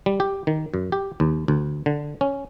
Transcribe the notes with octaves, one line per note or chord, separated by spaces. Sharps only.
G3
G4
D#3
F#2
G4
D#2
D2
D3
C#4